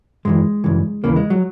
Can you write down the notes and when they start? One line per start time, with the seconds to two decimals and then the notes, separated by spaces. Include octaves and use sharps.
0.25 F#2 C#3 E3 G#3
0.64 F#2 C#3 E3
1.04 D#2 C#3 E3 A#3
1.16 G#3
1.30 F#3